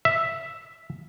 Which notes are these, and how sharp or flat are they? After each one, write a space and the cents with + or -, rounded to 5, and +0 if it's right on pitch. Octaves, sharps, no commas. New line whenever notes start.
E5 +0